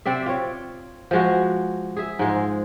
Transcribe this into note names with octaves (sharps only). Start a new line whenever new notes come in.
C3 C4 D5 E5
F4 C#5
F3 G#3 F#4
G#4 E5
G#2 F3 G#3